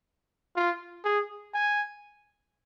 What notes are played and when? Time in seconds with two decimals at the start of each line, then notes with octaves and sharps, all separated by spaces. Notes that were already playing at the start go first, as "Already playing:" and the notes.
0.56 F4
1.05 G#4
1.54 G#5